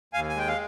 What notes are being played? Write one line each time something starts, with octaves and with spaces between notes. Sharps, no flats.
D#2 F5 G#5
G#5
G#3 G5
F5